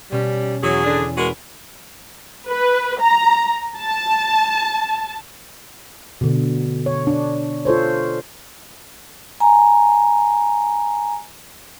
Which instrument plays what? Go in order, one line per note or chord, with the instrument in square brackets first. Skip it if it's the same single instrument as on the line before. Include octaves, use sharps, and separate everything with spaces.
[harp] B2 C#4 [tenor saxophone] G3
[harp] E2 [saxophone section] F#3 [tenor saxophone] G#4
[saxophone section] D3 D4
[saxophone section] G#3 F#4 A#4 [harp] B4
[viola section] B4
A#5
A5
[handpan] B2 D3
C#5
D4
F4 A4 C5 C#5
[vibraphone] G#5 A#5